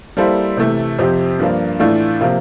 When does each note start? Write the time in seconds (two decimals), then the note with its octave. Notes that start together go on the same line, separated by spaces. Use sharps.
0.17 G3 A#3 E4 A4 C5
0.57 C3 E3 A3
0.99 F2 C3 F3 C4 G4
1.39 G2 F3 A#3 D4
1.79 A2 E3 A3 D4 F4
2.21 C3 F3 A#3